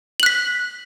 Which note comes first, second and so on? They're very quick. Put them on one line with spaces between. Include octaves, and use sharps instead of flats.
F#7 F#6 B6